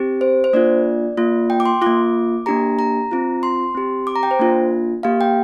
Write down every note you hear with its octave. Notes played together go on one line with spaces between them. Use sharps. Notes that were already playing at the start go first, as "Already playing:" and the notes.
Already playing: C4 G4
C5
C5
A#3 D4 F4 D5
A#3 F4
G5
D6
C6
A#3 F4 D6
A#3 D4 G4 A#5
A#5
C4 F4
C6
C4 G4
D6
A#5
G5
C5
A#3 D4 F4
A#3 G4 F5
G5